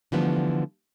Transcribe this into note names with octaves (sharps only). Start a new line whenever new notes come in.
D3 E3 F3 G3 A3 B3